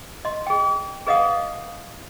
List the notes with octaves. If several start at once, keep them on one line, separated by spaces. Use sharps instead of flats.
D#5 C6
G#4 G5
G#4 B4 D#5 F5 F#5 D#6